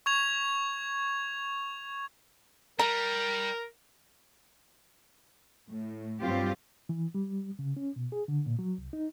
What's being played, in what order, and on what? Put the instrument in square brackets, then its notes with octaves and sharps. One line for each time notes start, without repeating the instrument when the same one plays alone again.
[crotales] C#6 G#6 F7
[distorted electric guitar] G3 [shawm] A#4 [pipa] A#5
[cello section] A2
G2 F#3 G3 C4 F4 G4
[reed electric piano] E3
G3
C#3
C#4
B2
G#4
D3
A#2
F#3
C2
D#4